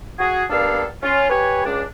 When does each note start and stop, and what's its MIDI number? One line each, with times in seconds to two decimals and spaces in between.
0.19 0.44 66
0.19 0.44 68
0.50 0.85 55
0.50 0.85 58
0.50 0.85 59
0.50 0.85 62
0.50 0.85 69
0.50 0.85 77
1.03 1.27 61
1.03 1.27 65
1.30 1.62 67
1.30 1.62 71
1.30 1.62 73
1.30 1.62 80
1.65 1.82 37
1.65 1.82 62